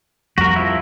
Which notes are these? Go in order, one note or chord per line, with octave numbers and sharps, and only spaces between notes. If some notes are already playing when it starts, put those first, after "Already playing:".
F2 G3 F#4 A#4
F3 E4